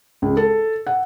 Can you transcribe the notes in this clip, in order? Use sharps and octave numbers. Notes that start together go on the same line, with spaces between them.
C#2
A4
F#5